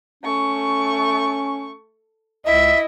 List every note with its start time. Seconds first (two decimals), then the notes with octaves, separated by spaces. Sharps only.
0.23 A3 C#4 C#6
2.46 C#2 E4 D#5 E5